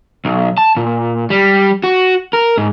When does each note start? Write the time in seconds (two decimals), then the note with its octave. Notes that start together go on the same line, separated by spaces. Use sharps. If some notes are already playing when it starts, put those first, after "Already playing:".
0.25 B1
0.58 A5
0.77 A#2
1.30 G3
1.84 F#4
2.33 A#4
2.57 G#2